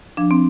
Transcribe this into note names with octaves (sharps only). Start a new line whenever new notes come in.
F3 D4
C4